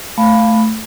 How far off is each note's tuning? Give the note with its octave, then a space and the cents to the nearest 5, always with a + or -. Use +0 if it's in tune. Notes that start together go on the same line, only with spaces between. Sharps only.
A3 +0 F5 +0 B5 +0